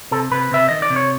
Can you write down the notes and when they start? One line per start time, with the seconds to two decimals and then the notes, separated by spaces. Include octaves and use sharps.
0.11 C3 A4
0.31 C3 B4
0.51 C3 E5
0.69 D#3 D#5
0.82 D5
0.90 C3
0.96 C#5